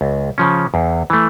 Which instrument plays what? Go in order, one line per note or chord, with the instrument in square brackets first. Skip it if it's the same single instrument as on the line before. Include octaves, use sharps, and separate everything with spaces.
[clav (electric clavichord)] C#2
C#3 F3 C#4
E2
E3 A3